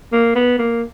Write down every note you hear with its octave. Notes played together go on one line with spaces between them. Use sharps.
A#3
B3
A#3